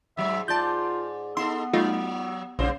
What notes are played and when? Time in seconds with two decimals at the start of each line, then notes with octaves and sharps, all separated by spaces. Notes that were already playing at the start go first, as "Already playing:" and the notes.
0.17 G#2 F#3 E5
0.48 G#2 F4 D5 A5 G6
1.37 B3 D#4 A4 C6
1.73 F#3 A3 D#4 F4
2.59 A#1 G2 C#3 C5